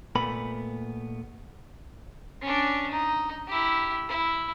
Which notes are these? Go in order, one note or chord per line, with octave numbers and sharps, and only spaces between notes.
A#2 A3 B3 B5
C#4 D4
D#4
E4 G4
E4